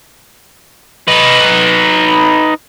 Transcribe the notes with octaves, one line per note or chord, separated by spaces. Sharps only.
D#4 B4